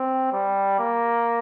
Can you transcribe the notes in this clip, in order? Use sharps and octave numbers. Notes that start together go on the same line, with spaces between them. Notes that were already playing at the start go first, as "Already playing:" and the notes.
Already playing: C4
G3
A#3